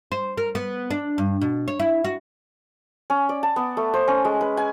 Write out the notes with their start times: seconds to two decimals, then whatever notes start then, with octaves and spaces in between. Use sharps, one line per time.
0.12 C5
0.38 A#4
0.55 B3
0.91 D4
1.18 G2
1.41 B2
1.68 C#5
1.80 E4
2.04 F#4
3.10 C#4
3.29 D5
3.43 A5
3.56 B3
3.77 A3
3.94 C5
4.08 C#4
4.25 G#3
4.41 B4
4.57 G#5